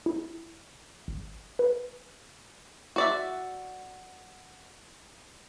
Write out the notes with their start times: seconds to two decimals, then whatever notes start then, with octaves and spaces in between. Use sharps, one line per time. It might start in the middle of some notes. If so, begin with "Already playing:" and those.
0.06 E4
1.08 G#1
1.59 B4
2.96 F#4 D5 E5